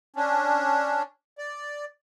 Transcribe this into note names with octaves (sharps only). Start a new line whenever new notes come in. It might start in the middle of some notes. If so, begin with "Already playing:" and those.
C#4 D4
D5